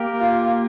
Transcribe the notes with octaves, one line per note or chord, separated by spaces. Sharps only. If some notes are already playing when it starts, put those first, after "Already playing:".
Already playing: A#3 G4 A#4
F4